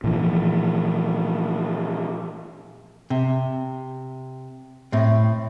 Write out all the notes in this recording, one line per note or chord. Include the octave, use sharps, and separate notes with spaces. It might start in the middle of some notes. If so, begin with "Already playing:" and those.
A#2 E3 F3
C3
A2 C4